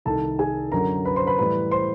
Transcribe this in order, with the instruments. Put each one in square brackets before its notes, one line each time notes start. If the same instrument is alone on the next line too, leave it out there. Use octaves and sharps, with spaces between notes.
[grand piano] C2 C3 D#3 A4 A5
G#4 G#5
F#2 D3 F#3 A#4 A#5
B4 B5
C5 C6
B4 B5
A2 E3 G3 B4 B5
C5 C6